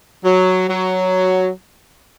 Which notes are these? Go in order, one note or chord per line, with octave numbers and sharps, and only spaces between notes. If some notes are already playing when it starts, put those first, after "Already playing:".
F#3
F#3